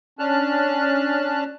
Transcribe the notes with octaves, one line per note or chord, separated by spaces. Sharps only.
C#4 D4 A5 F6 F#6